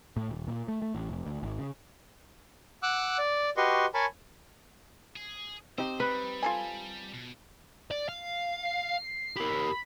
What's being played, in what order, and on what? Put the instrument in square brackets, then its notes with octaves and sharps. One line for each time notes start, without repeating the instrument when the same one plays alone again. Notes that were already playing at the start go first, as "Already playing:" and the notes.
[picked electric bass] A2
D#1
A#2
A3
A3
A1
F1
D2
G#1
C#3
[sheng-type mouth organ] F#5 D6 E6 F#6
D5
F#4 G4 B4 D#5 C6 C#6
A#4 C#5 G#5 A5 B5 C#6
[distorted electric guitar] G#4
[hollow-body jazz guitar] C4 D#4 G4 [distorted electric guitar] C5
[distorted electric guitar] G3 [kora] B4
[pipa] F4 A4 G#5
[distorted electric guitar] B2
D5
F5
[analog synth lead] C7
[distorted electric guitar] G4 A#4 [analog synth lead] B5